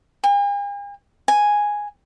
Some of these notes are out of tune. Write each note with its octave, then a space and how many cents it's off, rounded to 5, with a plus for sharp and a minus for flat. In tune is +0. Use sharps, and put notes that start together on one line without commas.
G#5 -45
G#5 -5